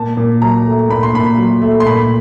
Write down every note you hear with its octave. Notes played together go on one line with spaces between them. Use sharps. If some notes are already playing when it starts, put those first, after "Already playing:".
Already playing: A#2 A5
A#2
F#3 A#5
A3
A#2 B5
C6
A#2 B5
F#3
A3
C6
A#2 B5